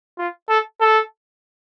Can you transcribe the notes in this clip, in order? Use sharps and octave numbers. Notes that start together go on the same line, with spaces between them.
F4
A4
A4